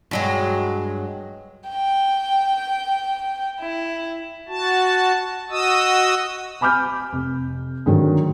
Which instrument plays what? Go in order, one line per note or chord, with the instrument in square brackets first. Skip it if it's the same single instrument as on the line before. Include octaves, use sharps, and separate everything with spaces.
[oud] G2 F#3 G#3
[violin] G5
E4
[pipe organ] F#4 A5
F#4 D#5 D#6 E6
[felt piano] G#5 B5 D6 F6 G6
F1
G#2 D3 D#3 F#3 A3